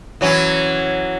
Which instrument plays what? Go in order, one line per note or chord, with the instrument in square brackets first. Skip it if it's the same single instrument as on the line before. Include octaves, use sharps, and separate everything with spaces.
[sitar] E3 F#3 C#4